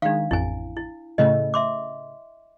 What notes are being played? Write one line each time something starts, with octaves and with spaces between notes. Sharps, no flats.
D#3 G#3 D4 F5
A1 F2 E4 G#5
E4
A2 C#3 A3 D#5
E5 C6 D6